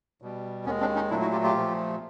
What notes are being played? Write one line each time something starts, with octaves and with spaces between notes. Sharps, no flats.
B2 G3
D#2 D#3 G#3 B3 C#4
C4 D4
C#4 D#4
A#2 F#3 A3 D4 E4
E4 F#4
F4 G4
F4 G4
A#2 F3 A3